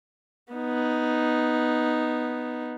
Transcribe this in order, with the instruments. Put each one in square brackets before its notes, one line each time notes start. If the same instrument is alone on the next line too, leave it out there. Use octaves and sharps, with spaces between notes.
[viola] B3 D#4